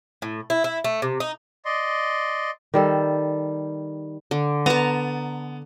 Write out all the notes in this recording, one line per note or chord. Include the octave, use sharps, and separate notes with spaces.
A2
E4
E4
A3
C3
D#4
D5 D#5 C6
D#3 G3 A4
D3
B3 A5 A#5